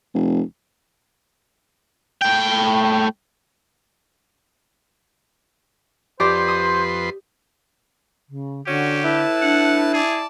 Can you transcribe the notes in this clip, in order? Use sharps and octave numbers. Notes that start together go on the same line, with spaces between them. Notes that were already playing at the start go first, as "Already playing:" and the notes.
F1
A2 G5
F2 G4 B4 C5 D5 C6 A#6
D#6
C#3
D3 C#4 F#4 G4
A2 E4 B4 A5
D4 F#5
G#4 D5 A5